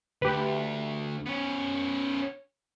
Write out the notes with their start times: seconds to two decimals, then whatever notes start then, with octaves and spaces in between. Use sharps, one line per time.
0.22 D2 G4 B4
1.26 B3 C#4